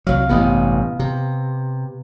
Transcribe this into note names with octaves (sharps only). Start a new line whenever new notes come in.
C2 F#3 F5
A1 G2 C3 B3 D#5
C3